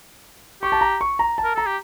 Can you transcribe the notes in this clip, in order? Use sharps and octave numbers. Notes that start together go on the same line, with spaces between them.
G4 C#6
A5
A#5
C#6
A#5
A5
A#4
A4 A#5
G4